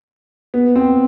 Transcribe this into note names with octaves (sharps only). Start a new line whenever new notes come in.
B3
C4